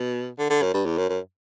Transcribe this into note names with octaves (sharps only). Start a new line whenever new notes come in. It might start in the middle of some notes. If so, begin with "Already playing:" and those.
Already playing: B2
D3
D3
F#2
G2
E2
F#2
F#2